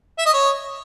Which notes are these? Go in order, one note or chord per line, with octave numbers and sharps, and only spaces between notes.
E5
D#5
C#5